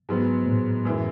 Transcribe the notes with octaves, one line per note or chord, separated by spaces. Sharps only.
G#2 F#3 B3
A2
F#2 E3 G#3